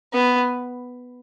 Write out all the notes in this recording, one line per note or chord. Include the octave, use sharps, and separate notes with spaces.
B3